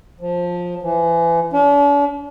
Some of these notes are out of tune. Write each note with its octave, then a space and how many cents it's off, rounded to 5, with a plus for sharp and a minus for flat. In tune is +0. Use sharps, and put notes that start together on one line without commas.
F3 +15
E3 +30
D4 -45